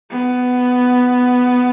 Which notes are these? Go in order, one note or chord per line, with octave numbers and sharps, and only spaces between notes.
B3